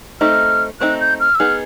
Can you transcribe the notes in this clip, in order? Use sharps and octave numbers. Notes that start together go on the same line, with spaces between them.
A3 C4 D#4 F6
A3 C4 D#4 F#6
G6
F6
E6
B3 D#4 G#4 F6